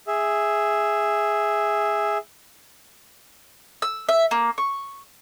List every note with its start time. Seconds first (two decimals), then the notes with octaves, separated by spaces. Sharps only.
0.07 G#4 E5
3.82 E6
4.09 E5
4.31 A#3
4.58 C#6